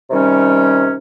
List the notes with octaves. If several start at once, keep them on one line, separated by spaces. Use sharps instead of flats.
C3 D#3 G3 C#4